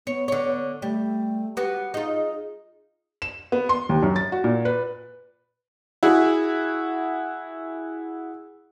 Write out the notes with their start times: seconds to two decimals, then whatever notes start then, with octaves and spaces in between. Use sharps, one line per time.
0.07 B3 C#5
0.28 D3 C#5
0.82 G3 A3
1.57 B3 F#4 G4
1.94 D#4 F4 G#4
3.22 E7
3.52 B3
3.69 C6
3.89 D#2
4.03 F#2
4.16 A6
4.32 F#4
4.44 A#2
4.65 B4
6.03 E4 F#4 G#4